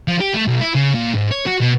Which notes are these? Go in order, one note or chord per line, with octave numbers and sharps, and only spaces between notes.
F3
G4
A3
B1
E4
C#3
A#2
G#2
C#5
F#4
B2